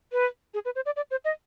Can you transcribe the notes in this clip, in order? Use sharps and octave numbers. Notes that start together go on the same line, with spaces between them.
B4
G#4
B4
C5
D5
D5
C5
D#5